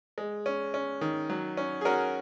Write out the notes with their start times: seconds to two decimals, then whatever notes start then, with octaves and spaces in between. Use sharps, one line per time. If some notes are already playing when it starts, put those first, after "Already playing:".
0.18 G#3
0.46 C#4
0.74 C#4
1.01 D#3
1.30 F#3
1.57 C#4
1.81 G#4
1.85 C#4 F#4 A#4